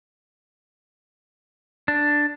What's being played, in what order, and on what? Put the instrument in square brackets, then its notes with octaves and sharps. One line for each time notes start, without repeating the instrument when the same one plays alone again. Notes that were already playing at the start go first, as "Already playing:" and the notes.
[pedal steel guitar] D4